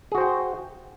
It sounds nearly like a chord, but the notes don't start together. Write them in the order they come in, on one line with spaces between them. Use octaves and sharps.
G#4 F#4 C5 G5